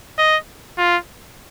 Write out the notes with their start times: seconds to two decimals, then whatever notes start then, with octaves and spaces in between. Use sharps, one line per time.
0.19 D#5
0.78 F4